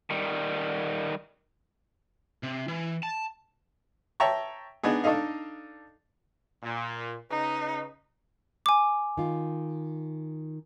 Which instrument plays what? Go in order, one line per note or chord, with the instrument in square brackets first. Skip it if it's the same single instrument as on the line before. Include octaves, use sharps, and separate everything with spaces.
[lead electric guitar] D#3 G3
[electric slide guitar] C3
E3
A5
[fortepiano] C#5 E5 G5 A5 A#5 C#6
B3 D4 D#4 G#4
D4 D#4 A4 D#5 F5
[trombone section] A#2
[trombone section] C#3 B4 [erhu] D#4
[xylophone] G#5 D6
[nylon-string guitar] D#3 F4